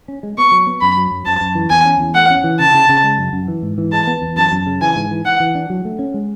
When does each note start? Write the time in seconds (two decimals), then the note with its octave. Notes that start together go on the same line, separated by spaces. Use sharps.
0.08 C#4
0.23 G#3
0.38 B3 C#6
0.52 F#3
0.67 B3
0.81 F#2 B5
0.97 F#3
1.11 F#2
1.25 F#2 A5
1.41 F#2
1.55 E3
1.70 E2 G#5
1.85 C#4
2.00 E2
2.15 A3 F#5
2.30 C#4
2.44 E3
2.59 C#3 A5
2.74 C#3
2.89 C#3
3.03 G#3
3.18 F#2
3.33 F#2
3.48 E3
3.62 G#2
3.78 E3
3.92 G#3 A5
4.07 B3
4.22 E2
4.36 F#2 A5
4.52 F#2
4.66 C#3
4.81 E3 G#5
4.96 G#2
5.11 E3
5.25 E3 F#5
5.40 E3
5.55 D4
5.70 F#3
5.85 A3
5.99 C#4
6.14 G#3